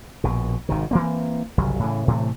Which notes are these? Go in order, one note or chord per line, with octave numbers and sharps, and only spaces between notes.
A#1 B2
G#1 C3 D#3
E3 A#3 C4
G1 C2 C#3 F#3
A2 C#3 E3
A2 C3 E3 A3